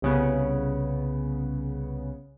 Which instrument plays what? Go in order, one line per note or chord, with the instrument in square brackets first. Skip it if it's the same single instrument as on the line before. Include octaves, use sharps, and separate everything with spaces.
[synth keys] C2 C#3 B3